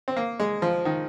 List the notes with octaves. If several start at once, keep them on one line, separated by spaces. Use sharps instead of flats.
C4
A#3
G#3
F3
D#3